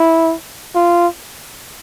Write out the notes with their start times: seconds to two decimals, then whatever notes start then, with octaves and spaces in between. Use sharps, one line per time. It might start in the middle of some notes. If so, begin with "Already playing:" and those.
Already playing: E4
0.75 F4